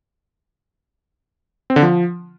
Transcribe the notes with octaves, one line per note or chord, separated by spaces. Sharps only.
C4
D3
F3